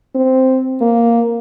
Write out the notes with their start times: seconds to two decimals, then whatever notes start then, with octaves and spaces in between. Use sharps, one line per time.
0.15 C4
0.81 A#3